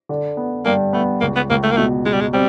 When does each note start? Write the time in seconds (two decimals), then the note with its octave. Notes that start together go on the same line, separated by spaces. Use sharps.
0.09 D3
0.37 B3
0.65 G2 A#3
0.93 A3 B3
1.21 C#2 A#3
1.36 B3
1.50 C#2 A#3
1.63 A3
1.71 A#3
1.77 B2 A3
2.05 B2 G#3
2.13 G3
2.21 G#3
2.33 G3 C4